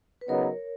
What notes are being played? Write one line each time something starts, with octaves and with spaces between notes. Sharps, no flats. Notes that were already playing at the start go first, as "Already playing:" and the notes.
B4
C#3 F#3 B3 D#4 A#4 C#5